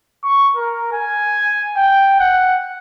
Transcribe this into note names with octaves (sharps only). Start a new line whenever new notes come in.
C#6
A#4
G#5
G5
F#5